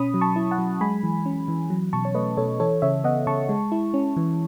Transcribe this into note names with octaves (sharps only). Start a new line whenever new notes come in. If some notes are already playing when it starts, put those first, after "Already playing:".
Already playing: B2 C#4 B5 D#6
F#3
A5 C#6
E4
F#5 A5
F#3
G#3 G#5 B5
E3
C#4
E3
F#3
B2 A5 C#6
C#5
A3 B4 D#5
B2 A4 C#5
E3 A4 C#5
C#3 C#5 E5
B3 D#5 F#5
C#3 A5 C#6
G#3
E4
C#4
E3